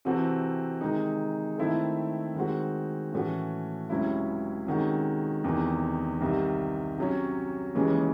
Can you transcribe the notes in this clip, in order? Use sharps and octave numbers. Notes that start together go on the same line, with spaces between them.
C3 E3 C4 F#4 A4
C3 D#3 G#3 D#4
D#3 A3 C4 E4 A4
D#3 G#3 C4 F#4
A2 E3 A3 C#4 F#4
C#2 C3 F#3 C#4 E4
C3 D#3 G#3 C#4 F#4
E2 C3 D#3
C2 C3 D#3
C3 F#3 C#4
D#2 C#3 E3 G#3 C#4